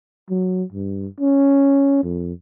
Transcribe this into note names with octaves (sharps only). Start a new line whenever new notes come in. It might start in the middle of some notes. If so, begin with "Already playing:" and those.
F#3
G2
C#4
F2